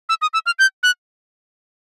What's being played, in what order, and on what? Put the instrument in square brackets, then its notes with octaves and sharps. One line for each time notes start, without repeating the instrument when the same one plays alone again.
[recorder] E6
D#6
E6
F6
G6
F#6